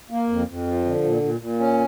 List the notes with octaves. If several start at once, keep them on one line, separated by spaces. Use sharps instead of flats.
A#3
F2
F2
F3
D3
A#2
A#2
A#2
C#4